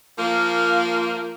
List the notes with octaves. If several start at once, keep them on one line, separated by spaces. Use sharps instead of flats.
F3 A#3